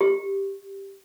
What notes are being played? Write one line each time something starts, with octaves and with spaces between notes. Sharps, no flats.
G4